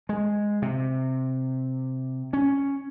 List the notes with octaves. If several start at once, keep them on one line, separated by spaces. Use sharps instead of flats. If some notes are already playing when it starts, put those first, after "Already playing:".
G#3
C3
C#4